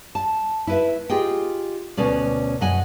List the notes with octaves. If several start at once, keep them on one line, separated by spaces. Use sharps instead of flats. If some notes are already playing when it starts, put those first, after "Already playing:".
A5
E4 B4 E5
F4 G4 G#4 D#5 G5
D2 B2 C#4 A#4 D5
F#2 D#5 F#5 G#5